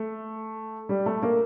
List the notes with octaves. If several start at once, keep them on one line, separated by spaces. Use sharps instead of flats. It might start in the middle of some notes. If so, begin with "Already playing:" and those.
Already playing: A3
G3
A3
A#3